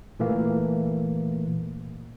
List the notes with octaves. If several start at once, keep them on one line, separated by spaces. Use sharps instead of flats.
A#2 E3 A3 A#3